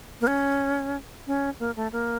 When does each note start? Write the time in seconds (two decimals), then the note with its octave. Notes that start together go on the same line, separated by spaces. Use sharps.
0.21 A#3
0.27 C#4
1.27 C#4
1.59 A#3
1.76 A3
1.92 A#3